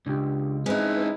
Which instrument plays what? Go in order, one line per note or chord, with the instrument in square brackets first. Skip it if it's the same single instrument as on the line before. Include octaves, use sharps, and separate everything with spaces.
[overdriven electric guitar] C#2 [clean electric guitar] D4 G4
[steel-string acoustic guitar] G#3 D#4 [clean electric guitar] C4 [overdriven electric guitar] C#4 E4 [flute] B4